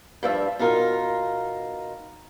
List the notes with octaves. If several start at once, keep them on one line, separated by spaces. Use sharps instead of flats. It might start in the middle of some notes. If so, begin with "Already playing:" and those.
G2 F3 E5
B2 D#4 F4 A#4